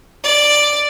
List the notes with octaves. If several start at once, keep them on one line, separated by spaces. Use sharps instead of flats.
D5